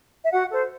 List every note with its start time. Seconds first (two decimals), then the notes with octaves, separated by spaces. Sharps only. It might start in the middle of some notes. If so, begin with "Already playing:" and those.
0.24 E5
0.32 F#4 F#5
0.51 A4 C5